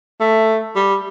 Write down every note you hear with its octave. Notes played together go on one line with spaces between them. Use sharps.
A3
G3